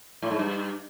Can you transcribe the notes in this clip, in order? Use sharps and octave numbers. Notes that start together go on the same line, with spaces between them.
A2
G#2
G2